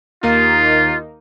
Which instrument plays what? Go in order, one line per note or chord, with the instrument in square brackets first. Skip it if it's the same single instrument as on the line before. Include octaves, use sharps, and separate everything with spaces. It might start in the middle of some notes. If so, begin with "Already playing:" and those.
[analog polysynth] D#2 A#3 D#4 [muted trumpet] F4